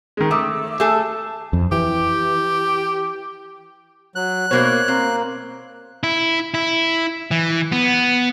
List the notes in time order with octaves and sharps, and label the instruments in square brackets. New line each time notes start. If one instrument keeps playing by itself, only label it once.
[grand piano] D#3 G#3
[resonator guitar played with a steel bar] A3 [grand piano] D6 D#6
[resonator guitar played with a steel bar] A3 G#4 A4
[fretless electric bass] F2
[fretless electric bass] E3 [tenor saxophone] G4
[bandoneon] F#3 [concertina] F#6
[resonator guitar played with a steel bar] B2 A#3 D#4 [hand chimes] C5 [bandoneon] C#5
[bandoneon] A#3 [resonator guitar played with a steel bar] C4
[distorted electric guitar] E4
E4
E3
B3